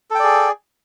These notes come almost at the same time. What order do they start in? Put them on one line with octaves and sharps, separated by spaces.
A4 G5 D5 G#4